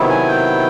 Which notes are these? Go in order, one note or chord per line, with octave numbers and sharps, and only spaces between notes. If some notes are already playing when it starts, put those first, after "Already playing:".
Already playing: C3 D#3 F#3 B3 E4
G#5
G5